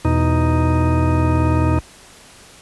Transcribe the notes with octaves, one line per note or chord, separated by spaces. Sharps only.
E2 B2 D#4